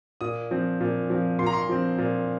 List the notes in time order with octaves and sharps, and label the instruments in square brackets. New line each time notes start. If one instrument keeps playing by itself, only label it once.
[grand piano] A#2 D#6
F3 C4
A#2
F3 C4
A#2 C6
A#5
C6
F3 C4
A#2